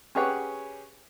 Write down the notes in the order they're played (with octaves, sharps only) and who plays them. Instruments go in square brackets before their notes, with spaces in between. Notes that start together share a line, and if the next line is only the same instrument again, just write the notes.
[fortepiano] C#4 G4 G#4 B4 C#5 F#5